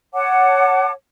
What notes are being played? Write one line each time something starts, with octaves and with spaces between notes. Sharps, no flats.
C#5 F#5 A5 D6